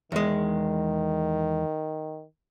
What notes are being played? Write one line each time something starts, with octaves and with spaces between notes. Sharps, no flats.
E2 D#3 G#3